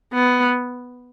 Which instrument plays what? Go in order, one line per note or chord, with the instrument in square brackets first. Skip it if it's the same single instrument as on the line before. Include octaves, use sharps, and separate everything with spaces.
[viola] B3